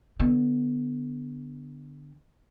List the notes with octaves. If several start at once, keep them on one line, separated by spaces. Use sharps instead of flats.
D3 B3